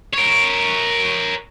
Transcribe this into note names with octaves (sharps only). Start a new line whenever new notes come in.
A#4 C#5